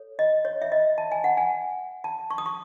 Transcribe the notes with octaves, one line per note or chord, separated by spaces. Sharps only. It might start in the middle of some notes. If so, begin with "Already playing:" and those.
Already playing: A4 C#5
D#5
C#5
E5
D#5
A5
G#5
F#5
G#5
A5
C#6
D#6
C#6